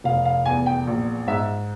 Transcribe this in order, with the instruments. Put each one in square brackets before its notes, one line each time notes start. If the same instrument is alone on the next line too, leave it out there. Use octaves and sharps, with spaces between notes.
[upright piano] F1 F5
F5
E2 G#5
G5
A#1
G#2 E5